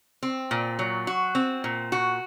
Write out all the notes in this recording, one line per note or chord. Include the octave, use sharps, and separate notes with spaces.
C4
A#2
F#3
F#4
C4
A#2
F#4